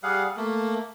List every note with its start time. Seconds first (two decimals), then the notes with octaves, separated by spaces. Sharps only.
0.03 G3 G#4 F5 F#5
0.37 A3 A#3